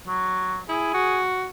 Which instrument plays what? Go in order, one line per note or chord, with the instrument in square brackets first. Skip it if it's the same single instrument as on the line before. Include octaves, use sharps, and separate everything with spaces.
[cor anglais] F#3
[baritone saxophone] E4 [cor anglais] G#4
[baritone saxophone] F#4